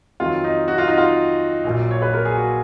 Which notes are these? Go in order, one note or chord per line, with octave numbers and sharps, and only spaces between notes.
F2 D#3 F#3 F4
D#4
F#4
F4
D#4
F4
A#1 A#2 F#3
C#5
B4
A#4
G#4
F#4